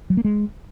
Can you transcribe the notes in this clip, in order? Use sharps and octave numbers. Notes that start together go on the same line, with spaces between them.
F#3
A#3
G#3